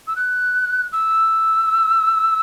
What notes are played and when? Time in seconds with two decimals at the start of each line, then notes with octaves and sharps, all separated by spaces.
0.08 E6
0.16 F#6
0.92 E6